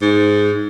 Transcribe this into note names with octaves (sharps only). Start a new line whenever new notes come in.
G#2